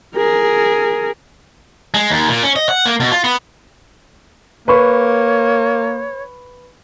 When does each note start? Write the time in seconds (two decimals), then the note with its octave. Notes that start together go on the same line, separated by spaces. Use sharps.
0.15 G#4 A#4
1.94 G#3
2.10 D#2
2.29 A#2
2.43 C#4
2.56 D#5
2.69 F#5
2.86 A#3
3.00 B2
3.11 F4
3.24 B3
4.68 A#3 B4 C#5 B5 C#6